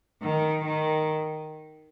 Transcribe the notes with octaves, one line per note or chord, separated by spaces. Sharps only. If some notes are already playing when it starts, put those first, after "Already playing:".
D#3
D#3